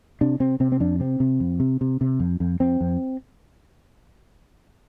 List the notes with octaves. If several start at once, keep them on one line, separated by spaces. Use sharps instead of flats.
C3 D4
C3 C4
C3 C4
C4
F2 D4
C3 C4
C3
F2
C3
C3
C3
F2
F2
F2 C4
F2